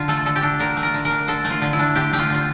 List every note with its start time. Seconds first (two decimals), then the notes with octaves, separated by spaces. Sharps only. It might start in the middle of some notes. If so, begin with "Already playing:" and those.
Already playing: D3 F4
0.08 A3 A4
0.26 D3 A4
0.36 G4
0.42 D4 A4
0.59 D3 A#4
0.77 A3
0.83 A#4
0.94 D3
1.05 A#4
1.11 D4
1.28 D3 A4
1.44 A3
1.50 F4
1.62 D3
1.73 E4
1.79 D4
1.96 D3 G4
2.13 A3 G4
2.19 F4
2.30 D3 F4